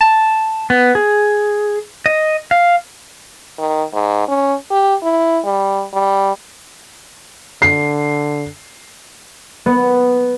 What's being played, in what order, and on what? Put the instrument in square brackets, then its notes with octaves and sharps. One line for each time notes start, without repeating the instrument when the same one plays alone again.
[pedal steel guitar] A5
B3
G#4
D#5
F5
[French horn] D#3
G#2
C#4
G4
E4
G3
G3
[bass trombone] D3 [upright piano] C7
[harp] B3